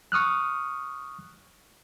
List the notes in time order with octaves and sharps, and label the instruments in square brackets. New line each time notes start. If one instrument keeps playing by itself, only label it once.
[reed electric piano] C#6 D#6 F6 F#6